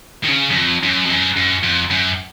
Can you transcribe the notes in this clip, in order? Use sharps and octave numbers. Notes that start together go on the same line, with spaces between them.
D#3
C#3
F#2
F2
F#2
F2
F#2
F#2
F2
F#2